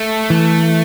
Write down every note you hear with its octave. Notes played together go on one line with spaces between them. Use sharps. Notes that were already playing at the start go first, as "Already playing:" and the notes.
Already playing: A3
E3